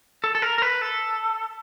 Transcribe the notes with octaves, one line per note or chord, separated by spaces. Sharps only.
A4
A4
A#4
A#4
B4
A4